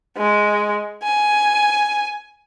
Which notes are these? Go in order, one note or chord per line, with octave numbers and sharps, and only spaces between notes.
G#3
G#5